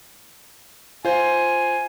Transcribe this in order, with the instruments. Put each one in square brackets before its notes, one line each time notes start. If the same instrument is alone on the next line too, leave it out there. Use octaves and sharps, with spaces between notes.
[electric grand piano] F4 C5 [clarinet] G#5